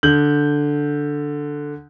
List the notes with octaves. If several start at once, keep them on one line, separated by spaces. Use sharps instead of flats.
D3 G6 F#7